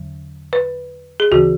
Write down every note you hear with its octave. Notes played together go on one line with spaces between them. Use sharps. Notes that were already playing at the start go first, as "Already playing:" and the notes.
Already playing: E2 D3 F#3
B4
G#4
D2 C#3 E3 F#4